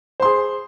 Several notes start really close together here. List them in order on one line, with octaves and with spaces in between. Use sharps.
C5 C6 G#4